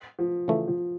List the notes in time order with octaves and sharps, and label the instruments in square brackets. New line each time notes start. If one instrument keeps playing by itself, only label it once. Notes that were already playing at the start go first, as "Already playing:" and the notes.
[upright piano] F3
[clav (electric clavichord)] C#3 E3 A3
[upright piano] F3